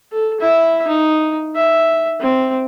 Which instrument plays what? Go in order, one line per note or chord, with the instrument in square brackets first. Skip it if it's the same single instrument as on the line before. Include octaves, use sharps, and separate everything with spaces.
[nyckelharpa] A4
E4 E5
D#4
E5
C4